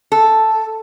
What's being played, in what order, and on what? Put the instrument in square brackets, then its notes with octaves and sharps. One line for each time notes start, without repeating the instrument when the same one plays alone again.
[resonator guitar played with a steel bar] A4